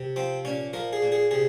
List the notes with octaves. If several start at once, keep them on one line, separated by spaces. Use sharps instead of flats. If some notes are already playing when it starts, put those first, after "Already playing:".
Already playing: C3
F3 C4
A#2 C#4
F3 A#4
G#4
A#2
G#4
C3 G#4